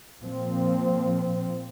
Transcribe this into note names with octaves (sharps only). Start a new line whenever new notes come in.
A#2 F3 C4